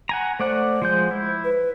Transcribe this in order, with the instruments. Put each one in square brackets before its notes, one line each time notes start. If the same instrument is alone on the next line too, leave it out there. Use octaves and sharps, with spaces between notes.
[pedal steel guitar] F#5 G#5 A#5
[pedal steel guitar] A3 D5 F#5 [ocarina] C5
[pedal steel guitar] F3 G#3 G6
E4
[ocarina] B4